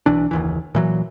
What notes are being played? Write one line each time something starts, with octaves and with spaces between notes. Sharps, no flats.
B1 E3 D4
F#1 D#2 E3
A#2 E3 F#3